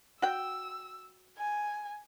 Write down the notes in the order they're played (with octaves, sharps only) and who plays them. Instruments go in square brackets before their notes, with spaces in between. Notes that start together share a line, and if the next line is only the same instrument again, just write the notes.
[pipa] F#4 G5 [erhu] E6
[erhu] G#5